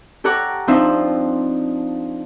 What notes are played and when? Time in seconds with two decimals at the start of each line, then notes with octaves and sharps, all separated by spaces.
0.24 G4 A4 C#5 F#5 A#5 D6
0.67 F3 C4 D4 D#4 C5 E5